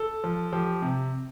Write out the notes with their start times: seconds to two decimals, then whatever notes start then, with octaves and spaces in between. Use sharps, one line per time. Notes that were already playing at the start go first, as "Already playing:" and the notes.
Already playing: A4
0.24 F3
0.52 F3 G4
0.82 C3